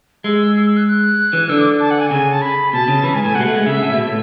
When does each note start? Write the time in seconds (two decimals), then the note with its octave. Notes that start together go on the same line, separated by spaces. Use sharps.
0.24 G#3 E6
0.56 E6
0.66 E6
0.77 F#6
0.87 F#6
1.33 E3
1.49 D3 E6
1.59 D6
1.80 A5
1.90 F#5
2.00 G#5
2.10 C#3 G#5
2.32 A5
2.42 B5
2.73 B2 A5
2.88 C#3
3.03 E3 B5
3.14 G#2 G#5
3.24 A2 G#5
3.35 B2 F#5
3.41 G#3
3.45 A3
3.55 G#3
3.66 C#3 E5
3.82 A2
3.93 B2
4.04 A2